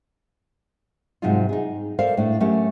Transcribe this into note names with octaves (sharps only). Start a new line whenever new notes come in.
G#2 C3 F#3 G3 D#4 F4
D#4 G#4
A4 A#4 C5 D5 E5 F5
A2 A3 D4
F#3 A3 C#4 G4 A#4